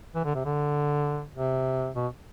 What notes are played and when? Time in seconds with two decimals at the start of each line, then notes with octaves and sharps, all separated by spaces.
0.15 E3
0.25 D3
0.35 C3
0.45 D3
1.35 C3
1.95 B2